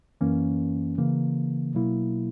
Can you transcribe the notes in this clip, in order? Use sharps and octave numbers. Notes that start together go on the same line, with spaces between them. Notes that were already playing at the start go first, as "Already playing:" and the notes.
F#2 E3 A#3 C#4
C#3 E3 A#3
B2 F#3 A#3 E4